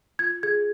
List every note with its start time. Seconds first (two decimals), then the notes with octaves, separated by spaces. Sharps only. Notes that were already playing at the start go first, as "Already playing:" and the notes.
0.19 F4 G#6
0.43 G#4 G#6